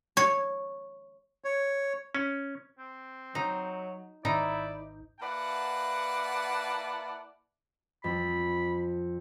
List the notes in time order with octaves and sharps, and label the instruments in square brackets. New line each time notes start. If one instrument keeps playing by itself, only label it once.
[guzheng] C#5
[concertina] C#5
[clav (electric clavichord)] C#4
[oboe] C4
[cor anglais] F#3 [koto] D#4
[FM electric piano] G#1 [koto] D#4 [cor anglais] E4 [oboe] D5
[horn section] A#3 E4 B4 D5 F#5 A5
[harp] F2 [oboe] B5